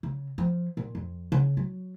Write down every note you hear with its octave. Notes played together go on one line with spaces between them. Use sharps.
C#3
F3
A#2
F2
C#3
F#3